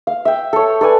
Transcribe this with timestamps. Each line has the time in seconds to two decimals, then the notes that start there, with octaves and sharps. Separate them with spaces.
0.07 F5
0.25 E5 G5
0.53 A4 C#5
0.81 A4 B4 D5 G#5